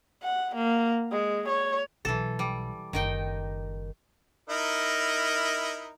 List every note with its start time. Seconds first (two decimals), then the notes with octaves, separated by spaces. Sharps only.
0.23 F#5
0.56 A#3
1.11 G#3
1.49 C#5
2.05 B1 E3 A4
2.39 G3
2.93 F#1 D#3 D#4 G5
4.50 D#4 E4 A#4